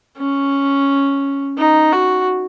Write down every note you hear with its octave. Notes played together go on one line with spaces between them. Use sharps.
C#4
D#4
F#4